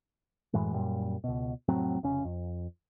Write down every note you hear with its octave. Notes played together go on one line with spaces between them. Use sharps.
F#2 A2 E3 G#3
F#2 A#2 G3
C#2 B2
F1 A2 F#3 C4
F1 C#3 C#4
F2